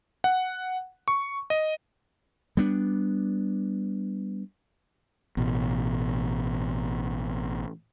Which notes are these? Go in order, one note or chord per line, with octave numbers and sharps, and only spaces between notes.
F#5
C#6
D#5
G3 B3 D4
A1 B2